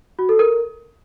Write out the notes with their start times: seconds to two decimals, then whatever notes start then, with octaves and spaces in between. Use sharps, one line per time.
0.19 F#4
0.29 A4
0.39 A#4